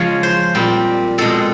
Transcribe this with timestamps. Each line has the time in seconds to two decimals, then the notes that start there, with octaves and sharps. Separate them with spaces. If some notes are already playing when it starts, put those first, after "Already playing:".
Already playing: C#3 F3 G#3 C#5
0.23 C5
0.55 A#2 G3 C4
1.18 B2 G#3 C4 A4